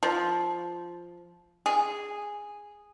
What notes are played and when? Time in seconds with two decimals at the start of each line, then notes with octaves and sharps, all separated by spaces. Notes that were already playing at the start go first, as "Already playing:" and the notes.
0.03 F3
1.66 G#4